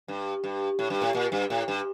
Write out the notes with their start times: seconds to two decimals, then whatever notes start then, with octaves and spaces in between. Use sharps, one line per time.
0.08 G2
0.44 G2
0.79 A2
0.90 G2
1.02 A2
1.15 A#2
1.32 G2
1.50 A2
1.68 G2